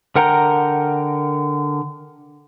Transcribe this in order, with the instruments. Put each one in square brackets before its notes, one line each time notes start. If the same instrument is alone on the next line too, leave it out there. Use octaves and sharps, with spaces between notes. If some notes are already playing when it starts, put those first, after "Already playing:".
[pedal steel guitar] D3 A#4 F#5 G5 A#5